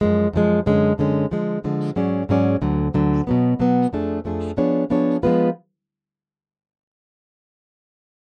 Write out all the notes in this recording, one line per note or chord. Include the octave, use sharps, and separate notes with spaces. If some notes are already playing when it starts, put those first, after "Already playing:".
F#2 F3 G#3
F#2 F3 G#3
F#2 D3 G#3 C#4
F#2 D3 G#3 C#4
D3 F3 G#3
D3 F3 G#3
G#2 F#3 C#4 G#4 D5
G#2 F#3 C#4 G#4 D5
D2 D3 F#3
D2 D3 F#3
B2 F#3 B3
B2 F#3 B3
F2 F3 A3 D4 G#4
F2 F3 A3 D4 G#4
F3 B3 D4 G#4 C#5
F3 B3 D4 G#4 C#5
F3 G#3 B3 F4 B4